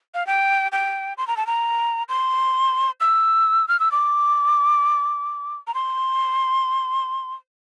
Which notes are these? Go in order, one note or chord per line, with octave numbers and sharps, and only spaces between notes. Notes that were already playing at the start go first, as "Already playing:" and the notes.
F5
G5
G5
C6
A#5
A5
A#5
C6
E6
F6
E6
D6
A#5
C6